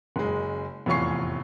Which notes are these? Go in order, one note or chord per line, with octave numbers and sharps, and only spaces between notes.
F#1 G#3
F1 E2 A2 F4 C#6 C7